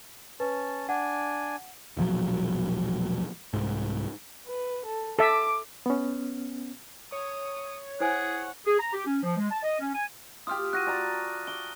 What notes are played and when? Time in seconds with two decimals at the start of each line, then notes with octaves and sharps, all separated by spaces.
0.40 C#4 B4 A5
0.89 D4 F#5 G#5
1.97 E1 A#1 F3 F#3
3.53 C2 G#2
4.46 B4
4.85 A4
5.19 A4 E5 D6
5.86 B3 C#4
7.12 C#5 D#6
8.00 E4 G#4 C5 F#5 G#5
8.66 G#4
8.79 A#5
8.93 G4
9.06 C#4
9.23 F3
9.37 G#3
9.51 A5
9.63 D#5
9.80 C#4
9.94 G#5
10.47 F4 G4 D#6 F6
10.73 F#4 F#6 A#6 D#7
10.86 D5 A5 A#5
11.47 D6 G7